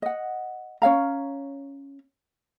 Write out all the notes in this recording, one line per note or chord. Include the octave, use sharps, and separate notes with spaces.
D#5 F#5
C#4 C#5 F5 A#5